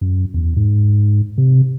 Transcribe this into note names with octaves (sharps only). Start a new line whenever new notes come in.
F#2
E2
G#2
C3